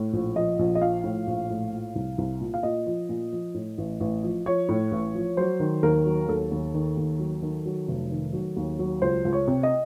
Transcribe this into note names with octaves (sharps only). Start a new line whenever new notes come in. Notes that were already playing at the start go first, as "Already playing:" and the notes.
Already playing: A2
A#1
F3 D#5
A#1
D#5
F3 F5
A2
A#1
A2
A#2
C2
C2
A#2
F5
A#2 D#5
F3
A#2
F3
A2
A1
A1
F3
F3 C#5
A2
A1
F3
F#3 C5
D#3
D#2 A#4
F#3
D#2 A4
D#2
D#3
D#2
F#3
D#3
F#3
F1
D#3
F#3
D#2
F#3
C#2 C5
C#2
C#5
C3
D#5